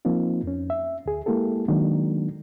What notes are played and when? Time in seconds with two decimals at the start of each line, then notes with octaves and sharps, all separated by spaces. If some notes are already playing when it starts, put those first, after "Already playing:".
0.05 F3 A#3 C4 D#4 F4
0.43 F2 C#4
0.70 E5
1.06 D2 G#4
1.26 G#3 A#3 E4 G4 A4
1.68 D#3 F#3 G#3 A#3 D4